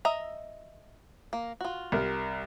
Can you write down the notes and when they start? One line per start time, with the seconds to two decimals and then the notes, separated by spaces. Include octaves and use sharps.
0.05 D#5 E5 A#5
1.33 A#3
1.61 F4 F#4
1.92 C2 A#4